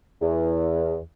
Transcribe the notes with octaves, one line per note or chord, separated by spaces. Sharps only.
E2